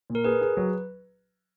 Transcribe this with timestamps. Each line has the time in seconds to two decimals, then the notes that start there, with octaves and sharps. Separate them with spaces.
0.10 A#2
0.15 A#4
0.24 G#4 B4
0.41 G#4
0.57 F#3